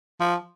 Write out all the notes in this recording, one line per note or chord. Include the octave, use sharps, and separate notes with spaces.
F3